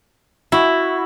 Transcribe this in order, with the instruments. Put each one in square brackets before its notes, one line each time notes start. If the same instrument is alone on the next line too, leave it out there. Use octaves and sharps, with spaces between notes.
[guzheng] E4 [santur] F#4